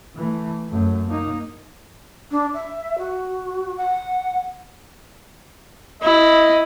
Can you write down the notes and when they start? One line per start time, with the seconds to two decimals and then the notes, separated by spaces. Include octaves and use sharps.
0.15 E3 A3
0.69 F#2 A3
1.07 A#3 D#4
2.31 D4
2.54 E5
2.98 F#4
3.77 F#5
6.02 E4 D#5